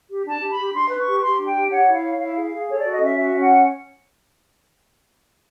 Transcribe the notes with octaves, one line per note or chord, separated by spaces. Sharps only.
G4
D4 A5
G4
B5
G4
D4 C6
B4
C#6
G4
G4 C6
D4
G5
G4
C#5 F#5
E4
F5
C#5
E4 F5
G#4
F5
G#4
A4 C#5
D5
F#4
D#5
C#4 E5
F#4 E5
C#4
F#5